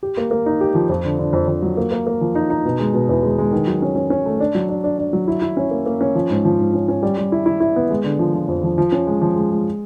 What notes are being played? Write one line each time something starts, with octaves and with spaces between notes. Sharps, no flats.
G4
A#3
A#3
D#4
G4
F3
F2
D3
D3
F2
F2
F#3
A#3
A#3
A#3
F3
D#4
D#4
B2
G#3
B2
E2
G#3
G#3
D#3
F#3
C#4
C#4
C#4
A3
D4
F#3
D4
D4
D4
F#3
E4
E4
C#4
A#3
A#3
C#4
F3
G#2
F3
G#2
C#4
C#4
G3
G3
E4
E4
E4
B3
G#3
D3
F3
F3
F2
F3
F3
C#4
G#3
F3
G#3
G#3